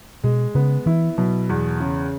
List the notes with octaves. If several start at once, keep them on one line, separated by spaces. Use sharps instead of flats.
B2 G#3
C#3 B3
E3 E4
B2 F#3
E2
C#3